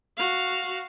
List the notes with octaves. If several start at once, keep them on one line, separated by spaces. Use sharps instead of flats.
F#4 F5